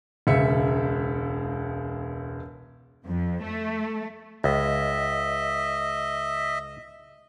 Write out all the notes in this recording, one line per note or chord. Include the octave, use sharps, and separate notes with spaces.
E1 C#2 C#3 E5 E6 C#7
F2
A3
C#2 D#5 E5